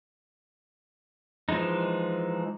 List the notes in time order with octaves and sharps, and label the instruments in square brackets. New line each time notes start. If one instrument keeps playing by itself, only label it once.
[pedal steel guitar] E3 F3 G#3 D#4